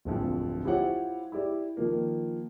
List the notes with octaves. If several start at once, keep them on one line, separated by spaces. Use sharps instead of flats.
D1 A#1 F2
E4 F4 G4 C5 C#5 F#5
E4 G4 D5
D#3 F3 A#3